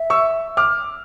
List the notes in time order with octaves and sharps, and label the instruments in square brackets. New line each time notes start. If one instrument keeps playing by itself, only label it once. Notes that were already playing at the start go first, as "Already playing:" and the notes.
Already playing: [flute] E5
[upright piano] C#6 E6
D6 F6